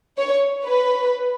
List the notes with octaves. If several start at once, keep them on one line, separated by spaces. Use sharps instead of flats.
C#5
B4